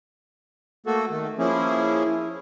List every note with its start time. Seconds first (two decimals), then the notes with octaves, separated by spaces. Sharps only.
0.86 A3 A#3 F#4 A4
1.10 D#3 A3
1.39 F3 A#3 C#4 E4 G#4